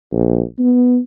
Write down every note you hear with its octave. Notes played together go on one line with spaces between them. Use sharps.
A#1
B3